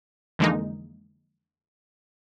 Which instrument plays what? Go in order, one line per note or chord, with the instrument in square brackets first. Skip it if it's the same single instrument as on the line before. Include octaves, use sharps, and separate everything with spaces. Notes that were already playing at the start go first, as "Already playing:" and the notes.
[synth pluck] F2 D3 E3 G#3 A#3 D#4